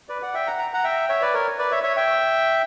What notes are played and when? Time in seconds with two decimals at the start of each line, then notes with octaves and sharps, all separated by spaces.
0.09 B4 D5
0.22 D5 F#5
0.34 E5 G5
0.47 F#5 A#5
0.59 A#5
0.73 F#5 A#5
0.84 E5 G5
1.09 C#5 E5
1.22 B4 D5
1.34 A#4 C#5
1.59 B4 D5
1.72 C#5 E5
1.83 C#5 E5
1.97 E5 G5